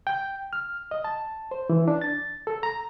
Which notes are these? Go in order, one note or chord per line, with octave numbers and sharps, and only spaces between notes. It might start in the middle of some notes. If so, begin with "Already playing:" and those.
G5
F6
D#5
A5
C5
E3
D4
A6
A4
A#5